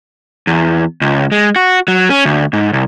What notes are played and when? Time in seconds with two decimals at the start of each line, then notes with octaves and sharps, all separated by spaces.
0.47 E2
1.01 C#2
1.32 G#3
1.56 F#4
1.88 F#3
2.10 C#4
2.25 D2
2.53 G#2
2.73 C2